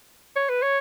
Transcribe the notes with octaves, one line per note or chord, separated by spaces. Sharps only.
C#5
B4
C#5